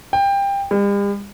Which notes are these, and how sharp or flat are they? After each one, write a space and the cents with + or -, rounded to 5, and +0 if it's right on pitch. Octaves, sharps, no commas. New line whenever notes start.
G5 +20
G3 +45